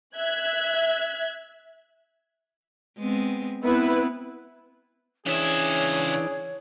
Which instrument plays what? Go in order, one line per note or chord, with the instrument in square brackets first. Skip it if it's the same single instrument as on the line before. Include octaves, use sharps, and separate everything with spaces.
[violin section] E5 F#6 G#6
[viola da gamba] G#3 B3 C4
[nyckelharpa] B3 [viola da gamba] C4 [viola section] E4 B4
[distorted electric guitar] C#3 E5 [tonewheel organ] E3 D4 [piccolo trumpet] G#4 [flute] C#5